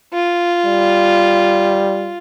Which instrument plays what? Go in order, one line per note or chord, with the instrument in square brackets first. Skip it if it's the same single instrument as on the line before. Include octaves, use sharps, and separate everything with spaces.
[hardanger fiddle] F4
[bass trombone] G3